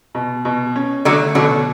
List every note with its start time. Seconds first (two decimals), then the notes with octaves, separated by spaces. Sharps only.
0.15 B2
0.45 B2
0.76 C#4
1.05 D3 F#3 A3
1.35 B2 D3 F#3